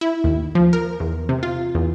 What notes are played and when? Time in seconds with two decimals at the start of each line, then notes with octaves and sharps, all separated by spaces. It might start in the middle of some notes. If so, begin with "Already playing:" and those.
0.01 E4
0.24 D#2
0.55 F3
0.73 A#4
1.00 E2
1.29 C3
1.43 F4
1.75 E2